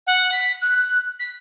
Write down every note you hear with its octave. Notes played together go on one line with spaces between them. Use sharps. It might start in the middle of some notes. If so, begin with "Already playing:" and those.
F#5
B6
F#6
B6